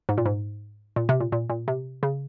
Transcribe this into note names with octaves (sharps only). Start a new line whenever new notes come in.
G#2
A#2
G#2
A#2
C3
A#2
A#2
A#2
C3
C#3